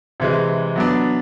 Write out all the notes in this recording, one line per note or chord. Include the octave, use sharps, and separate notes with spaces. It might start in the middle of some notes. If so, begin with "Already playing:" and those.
C3 E3 G#3
F#3 B3 D4